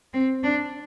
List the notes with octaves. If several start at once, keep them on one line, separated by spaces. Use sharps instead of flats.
C4
D4